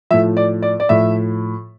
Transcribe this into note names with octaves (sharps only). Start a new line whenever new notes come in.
A2 F3 E5
D5
D5
D5
A2 F3 E5